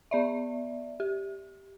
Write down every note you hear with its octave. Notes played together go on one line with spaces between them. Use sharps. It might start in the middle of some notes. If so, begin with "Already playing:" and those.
B3 D5 E5
G4